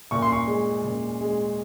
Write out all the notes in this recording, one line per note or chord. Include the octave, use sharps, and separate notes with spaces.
A#2 C#6
C6
C#6
G#3
A#2
G#3